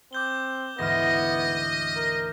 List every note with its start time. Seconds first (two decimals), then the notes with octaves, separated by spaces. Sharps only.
0.13 C4 D6 G6 G7
0.79 D2 G#2 E3 B3 D#5 F6 A#6
1.96 A#4